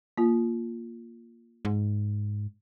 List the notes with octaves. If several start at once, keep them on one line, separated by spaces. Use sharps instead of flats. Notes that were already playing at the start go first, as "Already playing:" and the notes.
A#3 F4
G#2